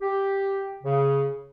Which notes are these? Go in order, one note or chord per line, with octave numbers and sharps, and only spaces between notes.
G4
C#3